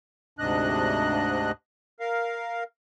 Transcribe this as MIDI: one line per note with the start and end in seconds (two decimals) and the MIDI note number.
0.39 1.52 38
0.39 1.52 44
0.39 1.52 48
0.39 1.52 62
0.39 1.52 75
0.39 1.52 90
2.00 2.64 70
2.00 2.64 77